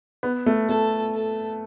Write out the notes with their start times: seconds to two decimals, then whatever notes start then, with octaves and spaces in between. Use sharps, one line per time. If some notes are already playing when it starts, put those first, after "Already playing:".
0.23 B3
0.46 A3
0.69 A3 A4
1.14 A4